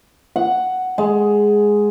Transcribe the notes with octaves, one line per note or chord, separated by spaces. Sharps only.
F#5
G#3